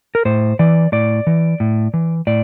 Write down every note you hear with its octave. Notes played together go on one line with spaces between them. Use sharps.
A#4
A2 C5
E3 D5
A2 D5
E3
A2
E3
A2 D5